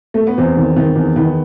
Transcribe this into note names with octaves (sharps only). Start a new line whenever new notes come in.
A3
B3
E2 C4
D#3
D#3
E2
D#3 B3